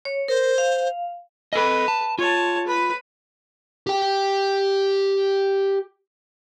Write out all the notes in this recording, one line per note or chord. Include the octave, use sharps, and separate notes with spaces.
C#5
A#4 C5
F5
A4 B4 D#5
A5
F4 C#5 A5
B4 B5
G4 G5